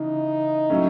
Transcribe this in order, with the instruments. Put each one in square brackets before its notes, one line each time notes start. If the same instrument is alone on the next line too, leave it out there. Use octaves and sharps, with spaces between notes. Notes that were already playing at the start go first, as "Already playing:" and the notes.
Already playing: [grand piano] C#3 E3 [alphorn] D#4
[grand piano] A2 F#3 A3 C#4